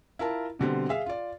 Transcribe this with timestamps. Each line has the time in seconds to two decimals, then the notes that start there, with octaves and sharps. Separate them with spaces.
0.19 E4 F4 A#4 A5
0.59 B2 D3 G3 C4
0.89 G#4 E5 F5
1.06 F4 D5